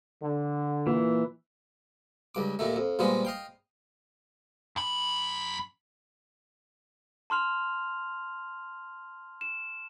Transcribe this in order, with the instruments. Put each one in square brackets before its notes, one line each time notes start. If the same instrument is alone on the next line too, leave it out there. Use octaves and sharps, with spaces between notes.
[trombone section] D3
[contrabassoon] A#2 [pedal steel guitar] E3
[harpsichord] C#2 G2 D6
D#2 A#2 D#3 A3
F2
A#2 D#3 F3 G3 G#3 B3
D#5 F5 G5
[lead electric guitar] F#2 B5
[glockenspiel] A5 C6 F6 F7
E7